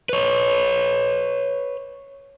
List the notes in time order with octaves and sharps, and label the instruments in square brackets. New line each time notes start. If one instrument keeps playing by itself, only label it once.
[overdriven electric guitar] B4 C#5